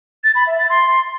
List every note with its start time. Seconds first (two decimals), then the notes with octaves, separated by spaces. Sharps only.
0.24 A6
0.35 B5
0.47 E5
0.58 A6
0.70 C6